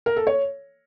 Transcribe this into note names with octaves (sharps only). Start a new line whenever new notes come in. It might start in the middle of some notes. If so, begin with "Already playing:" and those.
A#4
A4
C#5